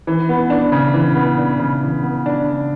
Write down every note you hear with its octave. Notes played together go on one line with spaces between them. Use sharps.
E3
B3
D4
C#3
E3
B3
D4
C#3
E3
B3
D4
C#3